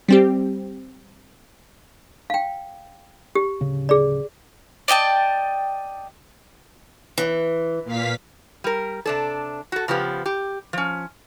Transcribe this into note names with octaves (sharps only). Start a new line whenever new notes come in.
G3 C4 G4
F5 G5
G4
D1 C#3 C#4
G#4 D5
D5 D#5 G5 A5
E3
A#2 F5 B6
G3 A#4
C3 D4 A4
F#4 A4
C#3 F3 B3 G4
G4
F3 C#4